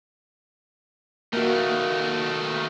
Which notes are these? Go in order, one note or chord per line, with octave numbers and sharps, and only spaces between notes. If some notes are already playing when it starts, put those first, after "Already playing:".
D#3 A3 A#3 F#4